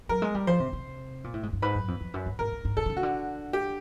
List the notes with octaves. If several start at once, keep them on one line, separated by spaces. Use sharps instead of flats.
F#3 A#4
G#3
G3
F3 C5
C3
C3
A#2
A2
G#2
G2
G#2 B4
F#2
F2
F2
F#2
G#2
G#2 A#4
G#2
G#2
A2 A4
C3
C#3
F#4
D3
G4